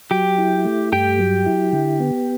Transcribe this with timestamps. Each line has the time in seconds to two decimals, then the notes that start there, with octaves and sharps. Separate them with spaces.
0.11 F#3 G4 G5
0.38 E4
0.65 A3
0.92 G2 G4 G5
1.19 F#3
1.46 E4
1.73 D3
2.00 B3